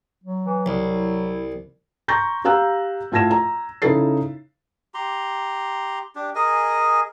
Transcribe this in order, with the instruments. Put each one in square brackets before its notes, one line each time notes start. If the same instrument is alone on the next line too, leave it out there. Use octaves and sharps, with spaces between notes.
[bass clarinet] F#3
[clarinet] E3
[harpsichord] C2 [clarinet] E4
[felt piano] A#5 C6 C#6 G6 A6 A#6
G4 F5 A#5 E6 F#6
A2 F4 A5 G#6 A#6 E7
A#5
C#3 D#4 E4 A4 A6 C7
[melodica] G4 A#5 C6
D4 G4
G#4 A#4 D#5 G#5